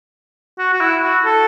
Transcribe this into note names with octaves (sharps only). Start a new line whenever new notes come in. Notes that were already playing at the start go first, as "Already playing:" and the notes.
F#4
F#4
E4
F#4
A4